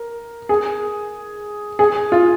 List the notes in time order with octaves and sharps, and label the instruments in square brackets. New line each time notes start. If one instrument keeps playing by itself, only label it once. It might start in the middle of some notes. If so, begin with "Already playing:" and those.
Already playing: [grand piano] A#4
G#4
G#4
F4